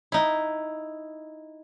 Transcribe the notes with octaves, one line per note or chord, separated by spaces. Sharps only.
D#4 E4